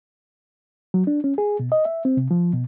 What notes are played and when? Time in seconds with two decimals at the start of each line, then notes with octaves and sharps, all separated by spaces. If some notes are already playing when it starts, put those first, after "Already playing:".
0.94 F#3
1.07 D4
1.24 C#4
1.38 G#4
1.60 B2
1.72 D#5
1.85 E5
2.05 C4
2.17 C3
2.31 F3
2.54 B2